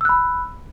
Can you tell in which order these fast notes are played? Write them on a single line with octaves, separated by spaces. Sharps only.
E6 F#6 B5